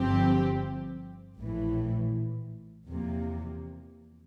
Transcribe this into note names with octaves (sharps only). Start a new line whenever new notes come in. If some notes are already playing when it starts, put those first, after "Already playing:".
Already playing: G1 G2 F3 C4 G4
A#1 A2 E3
E2 C3 F3 A#3